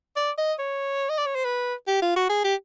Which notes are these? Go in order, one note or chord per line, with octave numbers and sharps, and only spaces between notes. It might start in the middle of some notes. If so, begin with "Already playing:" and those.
D5
D#5
C#5
D#5
D5
C#5
C5
B4
G4
F4
F#4
G#4
G4